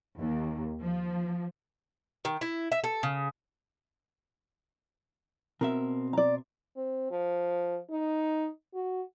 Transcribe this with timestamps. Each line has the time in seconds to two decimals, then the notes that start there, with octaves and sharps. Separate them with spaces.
0.18 D#2
0.81 F3
2.25 D#3
2.41 E4
2.72 E5
2.84 A4
3.03 C#3
5.61 B2 C4 A#4 E5
6.13 D5 A#5
6.76 C4
7.11 F3
7.91 D#4
8.74 F#4